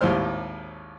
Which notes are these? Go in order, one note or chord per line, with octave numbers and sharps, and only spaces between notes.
G#1 D#2 A2 G3 C5 F6